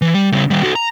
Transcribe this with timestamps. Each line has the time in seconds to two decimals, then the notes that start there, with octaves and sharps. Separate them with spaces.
0.02 E3
0.14 G3
0.32 C#3 G3
0.50 D#3 G3
0.63 F#4 A4
0.75 A#5